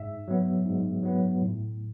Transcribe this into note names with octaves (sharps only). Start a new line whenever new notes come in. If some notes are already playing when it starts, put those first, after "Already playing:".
Already playing: G#2 E5
F#3 B3
G#2
F#3 B3
A2